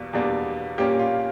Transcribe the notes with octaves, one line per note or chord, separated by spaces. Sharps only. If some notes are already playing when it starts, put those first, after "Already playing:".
Already playing: E2 B2 G3 A#3
E2 B2 G3 A#3 D4
A#2 G3 A#3 C#4 G4
F4